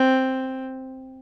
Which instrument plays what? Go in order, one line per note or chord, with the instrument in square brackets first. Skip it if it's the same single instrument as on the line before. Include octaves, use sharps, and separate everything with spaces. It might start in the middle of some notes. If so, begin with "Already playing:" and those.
Already playing: [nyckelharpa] C4